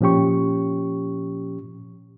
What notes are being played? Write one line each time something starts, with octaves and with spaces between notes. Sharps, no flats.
A#2 F3 C#4 G4 C#6